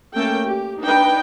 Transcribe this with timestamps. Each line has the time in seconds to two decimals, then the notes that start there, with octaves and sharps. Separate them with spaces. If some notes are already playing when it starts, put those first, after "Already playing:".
0.13 A3 A#3 C#4 A4 G5
0.46 G4
0.82 D4 D#4 B4 G5